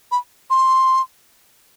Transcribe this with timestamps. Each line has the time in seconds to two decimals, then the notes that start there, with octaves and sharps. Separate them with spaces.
0.12 B5
0.50 C6